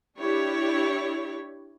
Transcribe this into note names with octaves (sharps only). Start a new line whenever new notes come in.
D4 E4 G4 C#5